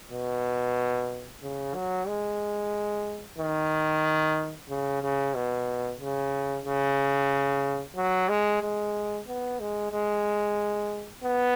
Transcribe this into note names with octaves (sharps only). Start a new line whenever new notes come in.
B2
C#3
F#3
G#3
D#3
C#3
C#3
B2
C#3
C#3
F#3
G#3
G#3
B3
G#3
G#3
B3